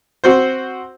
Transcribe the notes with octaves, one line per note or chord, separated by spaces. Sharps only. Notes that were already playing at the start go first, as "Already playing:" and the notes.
C4 F#4 C5